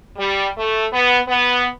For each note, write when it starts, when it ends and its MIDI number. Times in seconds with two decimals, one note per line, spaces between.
0.18 0.49 55
0.58 0.86 57
0.92 1.19 59
1.28 1.67 59